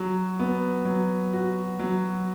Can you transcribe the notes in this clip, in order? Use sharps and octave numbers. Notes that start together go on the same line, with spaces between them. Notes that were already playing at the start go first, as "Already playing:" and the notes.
Already playing: F#3
B3
F#3
F#4
F#3